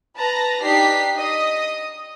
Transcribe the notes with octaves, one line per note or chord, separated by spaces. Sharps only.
B4 A5 A#5 A#6
D4 D#4 G4 B6 C7
D#5 D#6